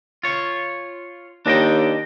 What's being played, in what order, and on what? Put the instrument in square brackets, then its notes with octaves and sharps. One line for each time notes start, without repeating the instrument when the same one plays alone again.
[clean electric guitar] F4 C#5
[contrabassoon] D#2 [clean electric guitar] D4 D#5 G5